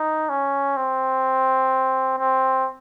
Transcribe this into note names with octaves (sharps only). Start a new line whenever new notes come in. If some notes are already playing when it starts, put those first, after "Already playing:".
Already playing: D#4
C#4
C4
C4